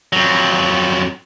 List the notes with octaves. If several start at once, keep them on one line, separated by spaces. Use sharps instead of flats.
F2 F#3